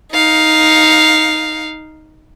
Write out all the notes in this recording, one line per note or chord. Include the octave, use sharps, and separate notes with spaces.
D#4 F5